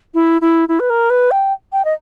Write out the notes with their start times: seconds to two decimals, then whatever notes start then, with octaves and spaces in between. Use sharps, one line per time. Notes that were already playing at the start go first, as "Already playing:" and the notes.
0.14 E4
0.41 E4
0.68 E4
0.80 B4
0.90 A#4
1.10 B4
1.31 G5
1.72 G5
1.85 D#5